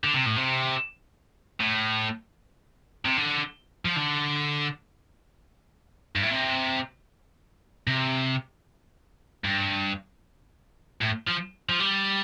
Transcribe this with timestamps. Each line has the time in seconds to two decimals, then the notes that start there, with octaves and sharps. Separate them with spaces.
0.04 D3
0.14 C3
0.26 A2
0.36 C3
1.61 A2
3.05 C3
3.17 D3
3.85 F3
3.96 D3
6.16 G2
6.23 A2
6.31 C3
7.87 C3
9.44 G2
11.02 A2
11.28 F3
11.70 F3
11.80 G3